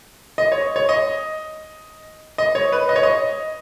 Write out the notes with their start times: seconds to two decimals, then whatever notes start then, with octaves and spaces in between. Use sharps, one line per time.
0.38 D#5
0.52 C#5
0.76 C#5
0.89 D#5
2.38 D#5
2.55 C#5
2.72 B4
2.89 D#5
2.96 C#5
3.03 D#5